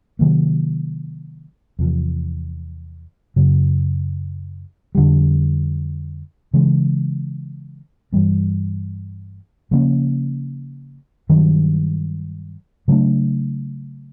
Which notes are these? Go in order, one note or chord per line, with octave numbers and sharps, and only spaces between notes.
C3 D#3 F#3 A#3
E2 C3 F3
F#2 C#3 F#3
F2 D3 G3
C#3 E3 G#3
G2 E3 G3 B3
C#3 F3 A#3 C#4
G2 D#3 F#3
C#3 F#3 A3 D4